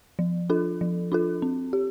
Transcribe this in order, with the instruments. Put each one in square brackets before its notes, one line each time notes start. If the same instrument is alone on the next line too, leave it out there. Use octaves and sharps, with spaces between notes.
[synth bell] F3
D4 F4 A4
F3
D4 F4 A4
C4
G4